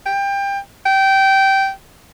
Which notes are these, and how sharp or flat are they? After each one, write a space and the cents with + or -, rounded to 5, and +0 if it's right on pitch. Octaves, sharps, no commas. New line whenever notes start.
G5 +25
G5 -15